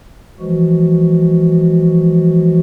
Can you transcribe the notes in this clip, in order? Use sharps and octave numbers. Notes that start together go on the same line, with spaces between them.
E3 F3 G#3 F#4